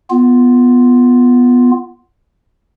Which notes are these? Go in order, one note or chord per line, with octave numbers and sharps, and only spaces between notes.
B3 F4